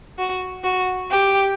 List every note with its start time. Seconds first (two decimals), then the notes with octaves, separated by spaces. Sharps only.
0.18 F#4
0.64 F#4
1.11 G4